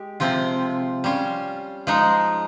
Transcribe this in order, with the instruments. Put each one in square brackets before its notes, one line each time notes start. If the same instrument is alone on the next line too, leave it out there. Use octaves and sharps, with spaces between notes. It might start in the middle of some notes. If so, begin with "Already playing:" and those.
Already playing: [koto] G#3 G4
C3 F3 C4 F4
G3 C#4 F4
F3 G#3 D#4